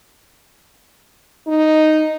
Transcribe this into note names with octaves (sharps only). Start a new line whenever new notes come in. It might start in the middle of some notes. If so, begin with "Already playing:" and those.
D#4